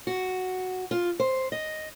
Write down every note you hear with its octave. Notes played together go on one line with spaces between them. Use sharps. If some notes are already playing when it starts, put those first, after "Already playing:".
F#4
F4
C5
D#5